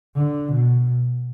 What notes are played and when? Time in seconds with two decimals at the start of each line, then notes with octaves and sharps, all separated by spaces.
0.15 D3
0.52 B2